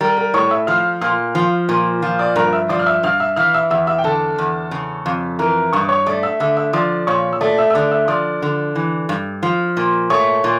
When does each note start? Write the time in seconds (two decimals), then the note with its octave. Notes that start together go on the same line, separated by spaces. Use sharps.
0.01 G3 A#4 A#5
0.17 A#4 A#5
0.34 A2 C#5 C#6
0.51 E5 E6
0.67 F3 F5 F6
1.01 A#2 F5 F6
1.35 F3
1.69 A#2
2.02 F3
2.19 D5 D6
2.36 G2 A#4 A#5
2.53 E5 E6
2.69 F3 D5 D6
2.79 F6
2.86 E5 E6
3.03 G2 F5 F6
3.20 E5 E6
3.36 E3 F5 F6
3.54 E5 E6
3.70 E2 E5 E6
3.87 E5 E6
3.98 G5
4.04 D3 A4 A5
4.38 E2
4.71 C#3
5.06 F2
5.39 E3 A#4 A#5
5.73 G2 C#6
5.81 D6
5.88 C#5 C#6
6.06 A3 D5 D6
6.23 E5 E6
6.40 D3 E5 E6
6.57 E5 E6
6.73 F3 D5 D6
7.07 A#2 C#5 C#6
7.33 E6
7.41 A3 D5 D6
7.58 E5 E6
7.70 E6
7.74 D3 D5 D6
7.91 E5 E6
8.08 F3 D5 D6
8.42 D3
8.75 E3
9.09 G2
9.43 F3
9.77 A#2
10.10 A3 C#5 C#6
10.44 A#2